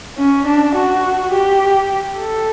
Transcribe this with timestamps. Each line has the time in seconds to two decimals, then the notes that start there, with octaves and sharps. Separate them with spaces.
0.18 C#4
0.47 D4
0.76 F#4
1.33 G4
2.19 A4